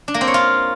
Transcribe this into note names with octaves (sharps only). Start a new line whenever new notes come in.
D4
A#3
C4
C#5
F4